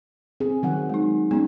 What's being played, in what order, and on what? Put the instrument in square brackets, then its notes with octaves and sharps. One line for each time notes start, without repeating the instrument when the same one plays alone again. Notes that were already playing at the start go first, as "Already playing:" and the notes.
[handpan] C4 G#4
D#3 F#3 F#5
[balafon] G#3 D#4
[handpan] G#3 [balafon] B3 C#4 D#4